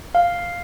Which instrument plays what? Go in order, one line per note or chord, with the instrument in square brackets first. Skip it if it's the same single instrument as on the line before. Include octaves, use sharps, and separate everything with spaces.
[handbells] F5